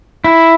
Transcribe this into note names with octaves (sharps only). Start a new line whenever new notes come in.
E4